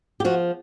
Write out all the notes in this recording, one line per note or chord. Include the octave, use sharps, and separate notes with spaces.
G4
F3 F#4